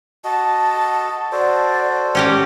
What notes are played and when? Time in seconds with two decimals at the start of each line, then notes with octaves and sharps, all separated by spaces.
0.24 F#4 D#5 A5
1.32 F#4 A4 C5 D5
2.15 C#4 G4 A#4